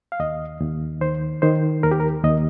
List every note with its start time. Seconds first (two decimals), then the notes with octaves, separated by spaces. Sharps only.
0.12 F5
0.20 D#2 D#5
0.61 D#2
1.01 D#3 C5
1.42 D#3 C5
1.83 D#2 A#4
1.91 G4
2.00 A#4
2.24 D#2 D#5